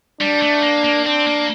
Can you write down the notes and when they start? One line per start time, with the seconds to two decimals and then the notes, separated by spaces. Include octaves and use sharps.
0.21 G3 D4
0.42 A3
0.63 A#3
0.84 A#3
1.05 C4 D4
1.27 A#3